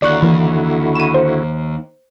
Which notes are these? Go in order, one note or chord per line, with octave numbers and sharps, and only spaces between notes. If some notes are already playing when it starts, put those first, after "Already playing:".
D#2 D3 E4 F#4 D5 C#6 F#6
E3 A#3
D#7 E7
C5